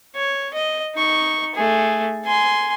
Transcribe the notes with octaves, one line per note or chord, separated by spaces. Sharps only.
C#5
D#5
D#4 C#6
A3 G#4
G#5 C6